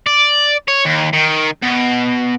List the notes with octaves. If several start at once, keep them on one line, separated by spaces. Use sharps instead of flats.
D5
C#5
D#2
D#3
B2